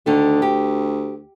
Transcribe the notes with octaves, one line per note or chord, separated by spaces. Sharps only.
D2 D3 D#3 A3
G4